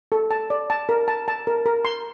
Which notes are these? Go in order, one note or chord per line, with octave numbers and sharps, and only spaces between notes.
A4
A5
D5
A5
A#4
A5
A5
A#4
A#4
C6